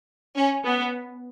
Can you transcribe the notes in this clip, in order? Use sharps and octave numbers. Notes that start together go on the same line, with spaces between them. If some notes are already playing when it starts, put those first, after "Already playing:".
C#4
B3